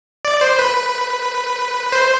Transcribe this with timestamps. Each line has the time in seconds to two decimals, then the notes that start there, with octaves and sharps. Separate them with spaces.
0.25 D5
0.41 C5
0.59 B4
1.92 C5